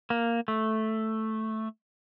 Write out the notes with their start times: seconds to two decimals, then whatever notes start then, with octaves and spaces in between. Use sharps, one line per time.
0.10 A#3
0.48 A3